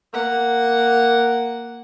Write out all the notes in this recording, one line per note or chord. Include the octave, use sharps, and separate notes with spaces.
A#3 F#5